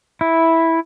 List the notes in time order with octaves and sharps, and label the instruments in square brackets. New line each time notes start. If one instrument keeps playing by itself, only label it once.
[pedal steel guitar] E4